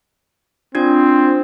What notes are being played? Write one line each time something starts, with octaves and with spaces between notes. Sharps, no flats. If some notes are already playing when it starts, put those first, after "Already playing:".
C4 D4 F4 G#6